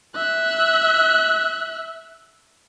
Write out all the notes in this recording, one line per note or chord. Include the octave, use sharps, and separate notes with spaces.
E5 F#6